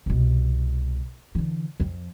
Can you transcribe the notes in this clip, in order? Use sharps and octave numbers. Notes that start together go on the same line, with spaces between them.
C2 B2
D3 E3
F2 F3